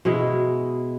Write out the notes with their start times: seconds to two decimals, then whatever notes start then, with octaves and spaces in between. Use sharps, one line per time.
0.05 B2 G#3 E4